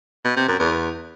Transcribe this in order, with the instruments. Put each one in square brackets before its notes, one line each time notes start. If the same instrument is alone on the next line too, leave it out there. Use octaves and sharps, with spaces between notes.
[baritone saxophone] B2
C3
F#2
E2